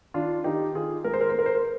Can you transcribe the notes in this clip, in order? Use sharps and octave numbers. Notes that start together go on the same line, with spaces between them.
D#3 D4 F4
D#3 D#4 G4
D#3 F4 G#4
G#3 A#4
C5
A#4
C5
G#3 A#4
C5
A#4